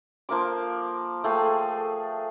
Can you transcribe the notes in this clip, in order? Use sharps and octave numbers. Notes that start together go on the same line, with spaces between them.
F3 A#3 A#4 D6
A3 G#4 F5 G5